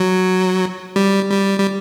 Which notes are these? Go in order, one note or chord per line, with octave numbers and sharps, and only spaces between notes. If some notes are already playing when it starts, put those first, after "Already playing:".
Already playing: F#3
G3
G3
G3